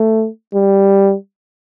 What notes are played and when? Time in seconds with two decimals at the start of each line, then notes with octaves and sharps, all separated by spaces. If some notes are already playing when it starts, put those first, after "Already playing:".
Already playing: A3
0.54 G3